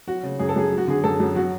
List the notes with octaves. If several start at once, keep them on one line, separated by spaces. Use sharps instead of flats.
F#3 F#4
C#3
F#2 G#4
A4
F#2 G#4
F#3
F#4
D3 G#4
F#2 A4
F#2
F#3 F#4